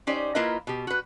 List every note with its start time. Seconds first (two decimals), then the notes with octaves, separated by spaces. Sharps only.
0.07 C#4 D#4 G4 C5 D5
0.35 A#3 E4 F4 A#4 B4 D#5
0.67 B2 G4
0.87 F#4 B4